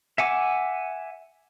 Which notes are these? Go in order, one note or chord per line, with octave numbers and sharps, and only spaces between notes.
E5 F#5 G#5 D6